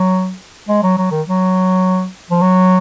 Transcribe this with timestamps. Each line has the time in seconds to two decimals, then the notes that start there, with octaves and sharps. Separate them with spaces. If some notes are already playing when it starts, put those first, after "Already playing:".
Already playing: F#3
0.69 G#3
0.83 F#3
0.97 F#3
1.11 D#3
1.26 F#3
2.30 F3
2.41 F#3